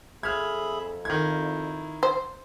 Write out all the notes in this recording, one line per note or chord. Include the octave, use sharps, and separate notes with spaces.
F2 G#4 A4 E5 B5 F6 G#6
D#3 E4 G#6
C5